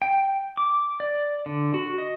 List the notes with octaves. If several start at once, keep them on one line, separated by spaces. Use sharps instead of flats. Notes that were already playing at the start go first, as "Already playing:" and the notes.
G5
D6
D5
D3
F#4
D#5